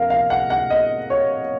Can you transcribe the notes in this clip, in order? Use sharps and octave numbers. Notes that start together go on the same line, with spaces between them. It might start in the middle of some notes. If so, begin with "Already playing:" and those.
Already playing: F2 A#4 F5
F5
F#5
F#5
D#5
C#5